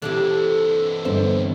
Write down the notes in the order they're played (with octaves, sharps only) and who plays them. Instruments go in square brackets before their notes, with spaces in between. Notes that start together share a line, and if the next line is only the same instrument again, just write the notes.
[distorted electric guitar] E3 C4 [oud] D4 E4 G4 [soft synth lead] A4
[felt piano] G1 [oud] C5 D5 E5